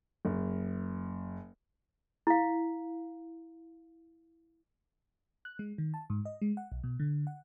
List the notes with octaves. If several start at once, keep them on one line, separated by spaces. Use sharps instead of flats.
F#1
E4 F5
F#6
G#3
D#3
A5
G#2
D#5
G#3
F#5
B1
B2
D3
F#5